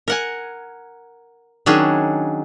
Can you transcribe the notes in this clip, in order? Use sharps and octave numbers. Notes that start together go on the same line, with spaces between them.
A#4 F#5 G#5
D#3 F#3 C#4 D4 G#4